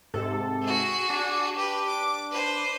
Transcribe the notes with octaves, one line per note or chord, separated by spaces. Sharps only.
G#2 C3 A4
F#4 G#4
D4
G4 B4
D6
B4 C5